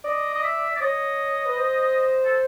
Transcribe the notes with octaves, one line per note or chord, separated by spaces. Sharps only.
D5 D#5
D#5
E5
D5
C#5 D#5
B4
C5
A4